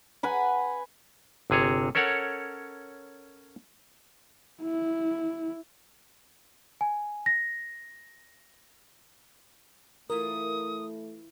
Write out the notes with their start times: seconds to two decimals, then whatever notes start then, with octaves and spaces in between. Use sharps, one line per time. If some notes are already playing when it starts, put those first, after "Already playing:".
0.23 B4 F#5 G#5 B5
1.50 G1 C3 G#4 C#5
1.95 C#4 A4 A#4 C#5 F#5
4.62 E4
6.81 G#5
7.26 A#6
10.10 E3 A3 E4 F4 A#4 D#6